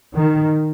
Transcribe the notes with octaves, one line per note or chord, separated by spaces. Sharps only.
D#3